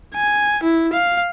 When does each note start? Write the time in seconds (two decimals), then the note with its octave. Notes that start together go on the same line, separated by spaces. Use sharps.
0.14 G#5
0.63 E4
0.93 F5